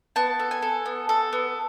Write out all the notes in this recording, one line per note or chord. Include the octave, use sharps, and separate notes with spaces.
B3 A5
A4
G#5
A4
B3
A4
B3